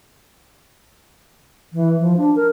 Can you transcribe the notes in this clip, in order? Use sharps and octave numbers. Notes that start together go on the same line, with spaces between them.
E3
F3
D4
A#4